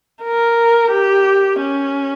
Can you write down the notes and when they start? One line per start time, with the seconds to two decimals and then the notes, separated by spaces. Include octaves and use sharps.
0.23 A#4
0.91 G4
1.60 C#4